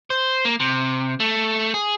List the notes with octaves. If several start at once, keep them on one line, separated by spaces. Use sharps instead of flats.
C5
A#3
C3
A3
G#4